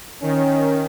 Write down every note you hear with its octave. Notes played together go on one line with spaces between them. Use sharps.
D#3 C#4